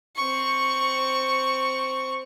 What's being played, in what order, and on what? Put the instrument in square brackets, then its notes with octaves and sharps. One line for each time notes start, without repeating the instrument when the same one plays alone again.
[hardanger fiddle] C4 C#6